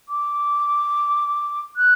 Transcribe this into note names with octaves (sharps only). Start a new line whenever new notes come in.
D6
F#6